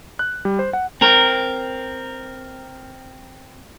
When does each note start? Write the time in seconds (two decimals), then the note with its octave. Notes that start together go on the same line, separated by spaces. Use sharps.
0.19 F#6
0.45 G3
0.59 C5
0.73 F#5
1.01 C4 A#4